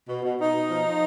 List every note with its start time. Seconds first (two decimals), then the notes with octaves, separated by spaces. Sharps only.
0.07 B2
0.23 B2
0.39 B2 D#4
0.54 B2
0.70 F3
0.84 F3